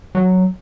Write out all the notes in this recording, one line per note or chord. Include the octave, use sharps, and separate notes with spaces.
F#3